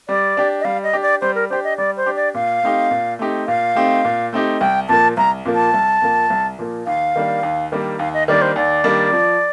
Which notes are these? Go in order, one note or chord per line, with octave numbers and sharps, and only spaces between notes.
G3 D5
D4 G4
D#5
G3 F5
D#5
D4 G4
D5
G3 C5
A#4
D4 G4 C5
D#5
G3 D5
C5
D4 G4
D5
A#2 F5
A3 C4 D#4 G4
A#2
A3 C4 D#4 G4
A#2 F5
A3 C4 D#4 G4
A#2
A3 C4 D#4 G4
C2 G5
A#2 F3 A#3 A5
C2 A#5
A#2 F3 A#3
A5
C2
A#2 F3 A#3
C2
A#2 F3 A#3
D#2 F5
D#3 G3 A#3 D4
D#2
D#3 G3 A#3 D4
D#2 F5
D#5
D#3 G3 A#3 D4 D5
C5
D#2 D5
D#3 G3 A#3 D4
F3